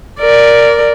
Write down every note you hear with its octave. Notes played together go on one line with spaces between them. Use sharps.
A#4 D5